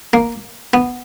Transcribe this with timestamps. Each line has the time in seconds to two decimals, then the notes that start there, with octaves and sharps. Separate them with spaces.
0.13 A#3
0.74 B3